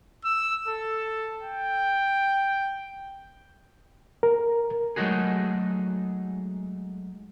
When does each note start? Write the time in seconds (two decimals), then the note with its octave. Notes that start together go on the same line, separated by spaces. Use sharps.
0.25 E6
0.68 A4
1.43 G5
4.23 A#4
4.96 F#3 G#3 A3 D#4 F#4 G#4